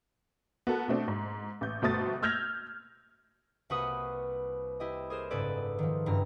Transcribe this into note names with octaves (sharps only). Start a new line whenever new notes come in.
B3 F#4 A4 A#4
B2 A3 C4 D4
G#2
A1 G6
G1 B2 A3 C5 D#6 A6
E6 F6 G6 G#6 A#6 F7
C2 A#3 F#4 B4 C#6 D#6
E4 G4 D#5
G#4 A#4 C5 E7
F#1 G#2 G#4 A4 B4 D5
D#3 F3
F#1 G2 E4 A#5 F6